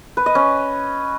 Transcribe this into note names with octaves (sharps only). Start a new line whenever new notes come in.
B4
D#5
C#4